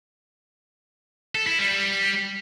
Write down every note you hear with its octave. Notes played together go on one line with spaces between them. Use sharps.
A4
E4
G3